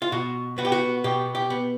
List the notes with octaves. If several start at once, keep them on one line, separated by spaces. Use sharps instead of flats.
F4
B2 F#4
B3 F#4
G4
F#4
B2 G4
G4
B3